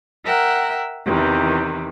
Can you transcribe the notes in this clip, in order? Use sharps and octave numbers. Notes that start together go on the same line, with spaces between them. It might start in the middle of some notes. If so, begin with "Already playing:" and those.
A#4 E5 F#5 G5
E2 C3 D#3 E3